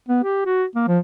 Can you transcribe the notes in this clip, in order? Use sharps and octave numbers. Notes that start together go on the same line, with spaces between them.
B3
G4
F#4
A#3
F3